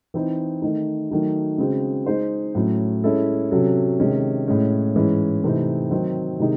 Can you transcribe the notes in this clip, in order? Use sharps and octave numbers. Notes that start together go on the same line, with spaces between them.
E3 C4 D#4
D#3 A3 D#4
D#3 F#3 A3 D#4
C#3 G#3 C4 F#4
G#3 D#4 G#4 C5
A2 F#3 C#4
G#3 C#4 E4 A4
C3 F#3 C#4 F#4 A4
C3 D#3 G#3 C#4
A2 G#3 C#4
G#2 E3 G#3 C#4
C3 E3 A3 C4 D#4
D#3 F#3 C4
C3 D#3 G#3 D#4